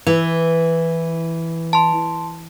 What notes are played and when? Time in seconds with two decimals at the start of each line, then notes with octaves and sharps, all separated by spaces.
0.07 E3 B4
1.73 A5 C6